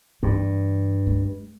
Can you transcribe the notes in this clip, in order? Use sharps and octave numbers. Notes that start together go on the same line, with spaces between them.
G2 E3
G#3